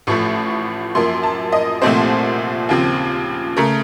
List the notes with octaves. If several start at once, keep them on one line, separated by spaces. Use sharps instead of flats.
A1 A2 F3 A3 C#6
F#2 F3 A#3 C6
A5
D#5
C2 A#2 F3 A3 C4 C5
D#2 C#3 F3 C4
C#3 A3 A#4